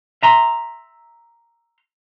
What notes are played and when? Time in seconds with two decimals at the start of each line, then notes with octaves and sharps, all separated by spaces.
0.23 E5 A#5 C6